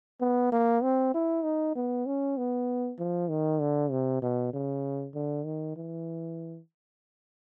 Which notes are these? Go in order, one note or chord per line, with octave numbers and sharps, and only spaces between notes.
B3
A#3
C4
E4
D#4
B3
C#4
B3
F3
D#3
D3
C3
B2
C#3
D3
D#3
E3